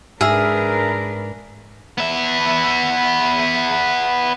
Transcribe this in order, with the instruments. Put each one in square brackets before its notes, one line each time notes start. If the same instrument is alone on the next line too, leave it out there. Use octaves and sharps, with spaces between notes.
[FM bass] G#2 [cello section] D4 A#4 B4 [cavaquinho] G#4 [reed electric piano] E5 E6 F6
[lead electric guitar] B3 E5